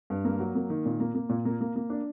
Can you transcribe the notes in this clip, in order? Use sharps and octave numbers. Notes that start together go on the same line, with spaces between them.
G2
A#3
F#3
A#3
D#3
A#2
A#3
A#3
A#2
A#3
A#3
A#3
D4